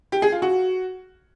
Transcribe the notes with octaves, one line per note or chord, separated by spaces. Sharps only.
G4
G#4
F4
F#4